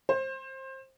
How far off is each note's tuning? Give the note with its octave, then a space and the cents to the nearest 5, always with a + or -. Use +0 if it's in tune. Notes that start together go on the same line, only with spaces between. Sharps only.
C5 +20